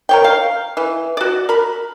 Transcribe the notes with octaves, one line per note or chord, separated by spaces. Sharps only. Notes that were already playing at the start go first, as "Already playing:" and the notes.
A#4 C#5 G5
F5
E3
F#4 D5
A#4 B5